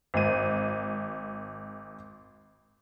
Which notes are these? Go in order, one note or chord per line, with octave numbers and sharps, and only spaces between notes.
G#1 D#7